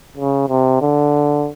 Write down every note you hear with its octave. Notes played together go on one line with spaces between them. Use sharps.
C#3
C3
D3